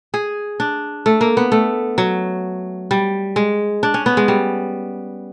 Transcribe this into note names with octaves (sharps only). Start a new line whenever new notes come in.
G#4
D4
A3
A#3
B3
A3
F#3
G3
G#3
D4
C#4
B3
G#3
G3